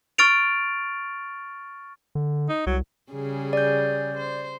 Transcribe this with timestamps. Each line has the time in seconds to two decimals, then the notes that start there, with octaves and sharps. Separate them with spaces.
0.18 C#6 F6 A6 D7 F7
2.15 D3
2.49 D#4
2.66 C2 F#3
3.12 C#3 G3 G#4
3.53 D5 G6
4.17 C5